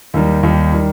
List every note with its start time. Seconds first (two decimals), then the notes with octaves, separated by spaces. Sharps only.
0.14 D#2 D#3 G3
0.43 D#2 D#3 G3
0.72 D#3 G3